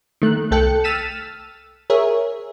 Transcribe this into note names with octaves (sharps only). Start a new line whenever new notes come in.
D#3 A3 F#6
C2 A3 A4 G5 F#6 C#7
E6 F6 A6 B6 D#7 E7
G#4 A#4 C#5 E5